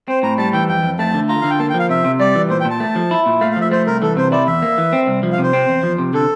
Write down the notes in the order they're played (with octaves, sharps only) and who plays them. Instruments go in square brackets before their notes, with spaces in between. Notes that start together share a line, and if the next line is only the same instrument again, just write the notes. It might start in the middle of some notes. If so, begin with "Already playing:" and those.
[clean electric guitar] C4 [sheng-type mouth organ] C5
[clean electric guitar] A2 [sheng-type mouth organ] A#5
[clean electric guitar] G3 [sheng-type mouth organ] A5
[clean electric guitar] E3 [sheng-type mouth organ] G5
[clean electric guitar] F2 [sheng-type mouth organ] G5
[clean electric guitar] F2
[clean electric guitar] A3 [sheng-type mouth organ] A5
[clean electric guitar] D3
[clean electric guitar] F4 [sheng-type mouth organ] A#5
[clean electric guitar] D3 [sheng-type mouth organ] F5
[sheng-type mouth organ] G5
[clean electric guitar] A#3 [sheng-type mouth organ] A5
[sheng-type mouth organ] G5
[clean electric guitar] F3 [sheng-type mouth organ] F5
[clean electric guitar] C3 [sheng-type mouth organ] E5
[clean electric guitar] C3
[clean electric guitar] G3 [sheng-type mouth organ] D5
[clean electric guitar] E3
[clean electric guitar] A#2 [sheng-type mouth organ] C5
[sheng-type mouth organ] G5
[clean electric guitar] A#2
[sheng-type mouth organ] A5
[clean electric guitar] A3
F3
E4
A#2
[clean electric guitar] A3 [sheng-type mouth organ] F5
[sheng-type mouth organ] F5
[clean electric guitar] F3 [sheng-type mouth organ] E5
[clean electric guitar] A3 [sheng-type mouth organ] C5
[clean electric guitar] C2 [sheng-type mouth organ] A#4
[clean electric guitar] E3 [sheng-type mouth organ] A4
[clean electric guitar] C3 [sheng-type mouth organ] C5
[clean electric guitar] E4 [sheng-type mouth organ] D5
[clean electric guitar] E2 [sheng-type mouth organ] E5
[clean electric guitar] A#3
E3
C4
C2
F3
[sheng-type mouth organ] F5
[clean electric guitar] C3 [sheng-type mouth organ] C5
[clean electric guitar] C4
E2
F3
C3
[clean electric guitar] D3 [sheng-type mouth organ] A4